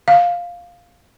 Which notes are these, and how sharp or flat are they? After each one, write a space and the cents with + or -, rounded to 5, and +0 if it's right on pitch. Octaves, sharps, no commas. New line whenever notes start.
F5 +5